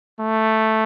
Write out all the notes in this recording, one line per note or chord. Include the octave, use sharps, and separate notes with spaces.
A3